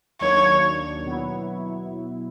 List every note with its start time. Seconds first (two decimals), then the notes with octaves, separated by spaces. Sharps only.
0.21 D#2 D#3 F#3 A#3 D4 C#5
1.05 B2 F#3 B3 E4